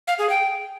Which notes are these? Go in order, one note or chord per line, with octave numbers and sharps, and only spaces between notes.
F5
G#4
G5